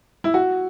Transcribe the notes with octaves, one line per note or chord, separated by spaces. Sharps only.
E4
F#4